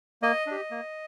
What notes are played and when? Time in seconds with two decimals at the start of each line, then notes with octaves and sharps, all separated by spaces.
0.22 A#3 D#5
0.46 D4 G4
0.71 A#3